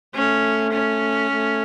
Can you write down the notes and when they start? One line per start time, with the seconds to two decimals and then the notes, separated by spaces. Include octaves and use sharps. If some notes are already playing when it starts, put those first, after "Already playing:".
0.14 A3 C#4
0.73 C#4
1.30 A3